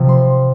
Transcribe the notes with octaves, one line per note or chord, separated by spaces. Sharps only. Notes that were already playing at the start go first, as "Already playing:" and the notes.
Already playing: C3 F3
C6